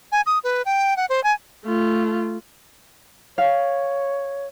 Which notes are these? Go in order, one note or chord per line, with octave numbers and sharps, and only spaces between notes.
G#5
D#6
B4
G5
F#5
C5
G#5
A3 F4
C#5 F5